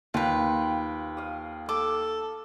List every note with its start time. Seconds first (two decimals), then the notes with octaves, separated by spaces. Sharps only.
0.14 D#2 F4 B4 G5
1.17 F5 D#6
1.69 A4 D6